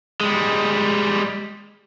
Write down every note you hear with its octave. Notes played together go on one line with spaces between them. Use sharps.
G3 G#3